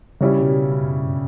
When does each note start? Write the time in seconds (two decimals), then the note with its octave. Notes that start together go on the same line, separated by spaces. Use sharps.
0.21 C#3 G3 C#4 E4
0.40 B2
0.81 F#2
1.01 G2